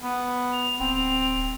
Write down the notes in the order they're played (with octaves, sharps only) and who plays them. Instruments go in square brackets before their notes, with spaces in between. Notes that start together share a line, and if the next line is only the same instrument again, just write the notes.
[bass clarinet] B3
[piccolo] F7
[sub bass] D1 [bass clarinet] C4